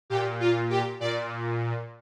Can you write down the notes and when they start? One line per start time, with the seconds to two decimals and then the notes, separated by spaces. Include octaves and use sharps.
0.10 A#2 G4
0.40 F4
0.70 G4
1.00 A#2 D5